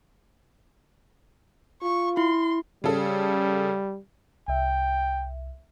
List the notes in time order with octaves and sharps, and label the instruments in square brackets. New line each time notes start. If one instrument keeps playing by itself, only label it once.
[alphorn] F4 [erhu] C#6
[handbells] E4 [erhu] C6
[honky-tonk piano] C#3 A4 [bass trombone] G3
[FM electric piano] C2 E5 [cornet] G5